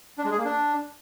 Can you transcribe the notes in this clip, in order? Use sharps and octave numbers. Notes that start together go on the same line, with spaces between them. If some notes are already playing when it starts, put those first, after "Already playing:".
D4
G#3
G#4
A#3
D4